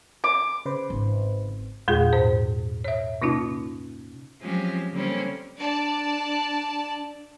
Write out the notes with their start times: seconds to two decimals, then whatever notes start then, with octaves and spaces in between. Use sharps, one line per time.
0.24 D6
0.66 C#3 B4 C5
0.90 G#1
1.88 E2 A#2 G#3 F4 G#4
2.13 G#2 C5
2.84 C#5 E5
3.22 C3 A#3 C#4 D#4 F4
4.41 F3 F#3 G#3 C4 C#4 G4
4.92 D3 G3 A#3 C4 C#4
5.59 D4 D5 A5